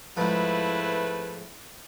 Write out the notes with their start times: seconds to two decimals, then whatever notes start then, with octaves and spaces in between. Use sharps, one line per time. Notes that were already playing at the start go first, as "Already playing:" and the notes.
0.17 G#2 F3 A3 C4 E4 B4